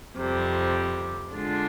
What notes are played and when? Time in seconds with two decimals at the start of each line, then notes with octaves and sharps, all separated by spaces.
0.16 F2 C3 G3
1.33 D3 G#3 D4 F4